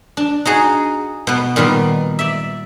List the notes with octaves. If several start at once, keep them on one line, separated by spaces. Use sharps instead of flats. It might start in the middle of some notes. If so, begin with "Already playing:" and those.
D4
D#4 F#4 G#4
B2 B3
A#2 D#3 G3 B3
D5 E5